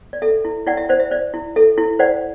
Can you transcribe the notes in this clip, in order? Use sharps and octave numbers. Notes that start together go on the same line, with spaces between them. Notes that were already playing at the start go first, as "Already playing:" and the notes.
D5
A4 E5
E4
E4 D5 F#5
E5
C5 D5 F#5
E5
C5 D5
E4
A4 E5
E4
C5 D5 F#5